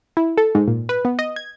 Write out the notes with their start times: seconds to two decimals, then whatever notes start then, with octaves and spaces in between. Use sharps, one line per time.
0.17 E4
0.38 A4
0.55 G#2
0.68 A#2
0.89 B4
1.05 B3
1.19 D#5
1.36 G#6